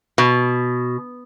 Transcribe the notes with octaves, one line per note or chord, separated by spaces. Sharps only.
B2